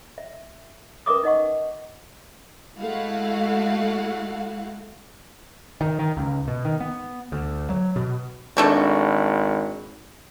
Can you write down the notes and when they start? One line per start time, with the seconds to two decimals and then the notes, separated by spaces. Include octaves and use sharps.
0.18 E5
1.06 C#4 A#4 B4 E5 D6 D#6
1.23 D#4 D#5 F#5 C#6
2.78 G#3 A3 E4 F#4 F5 F#5
5.81 D#3
5.99 D#3
6.17 C#2
6.48 B2
6.65 D#3
6.80 B3
7.32 D2
7.70 F#3
7.96 B2
8.57 G#1 A3 D4 F#4